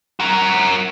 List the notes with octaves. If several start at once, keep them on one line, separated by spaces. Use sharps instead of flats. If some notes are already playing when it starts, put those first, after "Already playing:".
F#4 A#4